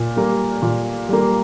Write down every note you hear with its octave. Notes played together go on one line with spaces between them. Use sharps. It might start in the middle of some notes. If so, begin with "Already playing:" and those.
Already playing: A#2
G3 A#3
A#2
G3 A#3